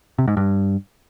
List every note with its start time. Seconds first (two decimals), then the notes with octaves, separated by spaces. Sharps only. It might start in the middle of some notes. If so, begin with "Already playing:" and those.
0.18 C3
0.28 G#2
0.37 G2